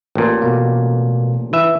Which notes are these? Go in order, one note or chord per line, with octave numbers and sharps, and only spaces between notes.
A1 A#2
B2 A#3
E3 B4 E5